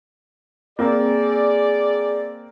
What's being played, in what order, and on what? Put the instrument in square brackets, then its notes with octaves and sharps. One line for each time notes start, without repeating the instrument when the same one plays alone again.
[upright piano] A#3 C4 [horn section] G#4 D5